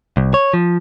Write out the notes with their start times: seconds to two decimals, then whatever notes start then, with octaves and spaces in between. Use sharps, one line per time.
0.17 C2
0.34 C#5
0.54 F3